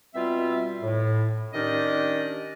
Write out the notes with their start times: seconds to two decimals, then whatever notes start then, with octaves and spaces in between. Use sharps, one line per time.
0.14 B2 G3 C4 F4 E5
0.81 A2
1.53 D#3 C#4 D4 G4 D5 D#5